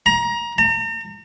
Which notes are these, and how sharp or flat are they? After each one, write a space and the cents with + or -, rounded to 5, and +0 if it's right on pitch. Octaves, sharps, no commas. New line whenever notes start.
A#5 +25
A#5 -40